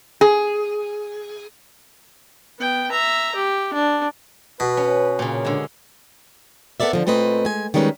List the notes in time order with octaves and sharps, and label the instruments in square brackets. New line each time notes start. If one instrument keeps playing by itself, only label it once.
[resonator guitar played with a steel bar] G#4
[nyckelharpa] B3 G5
E5 A#5
G4
D4
[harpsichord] B2 [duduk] B4
[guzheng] C#4
A#2 C#3
D3 G#3
[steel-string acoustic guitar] B3 A4 A#4 D5 E5
D3 F3
A#2 A3 C4 B4 D#5
G#3 G#5
D#3 G3 G#3 C#4 D#4 B4